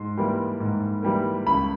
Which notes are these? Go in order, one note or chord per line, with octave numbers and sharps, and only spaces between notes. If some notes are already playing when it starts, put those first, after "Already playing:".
Already playing: G#2 C6
E3 G3 A#3
G#2
E3 G3 A#3
C#2 B5